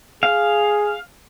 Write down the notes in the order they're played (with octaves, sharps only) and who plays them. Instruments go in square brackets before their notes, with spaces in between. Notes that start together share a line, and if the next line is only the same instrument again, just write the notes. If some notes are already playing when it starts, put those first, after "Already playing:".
[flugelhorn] G#4 [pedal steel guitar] F5